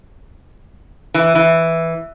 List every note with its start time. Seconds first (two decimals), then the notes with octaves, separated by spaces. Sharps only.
1.14 E3
1.35 E3